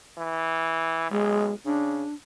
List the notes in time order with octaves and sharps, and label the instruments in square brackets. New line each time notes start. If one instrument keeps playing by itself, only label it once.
[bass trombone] E3
[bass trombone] B1 [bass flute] G#3
[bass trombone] C#3 [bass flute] D4